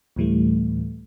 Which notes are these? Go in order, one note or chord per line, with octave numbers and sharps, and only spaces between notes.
D2 A2 E3 G3 A3